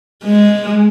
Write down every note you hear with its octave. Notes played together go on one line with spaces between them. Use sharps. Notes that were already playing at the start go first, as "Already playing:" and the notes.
G#3